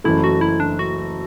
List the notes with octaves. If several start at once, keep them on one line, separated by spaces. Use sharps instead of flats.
F#1 F#2 E3 A3 E4
F#4
E4
D4
F#4